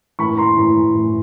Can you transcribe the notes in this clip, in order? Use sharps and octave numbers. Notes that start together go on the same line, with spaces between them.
A2 E3 B5 C#6
A#5 C6
A2 E3
A2 E3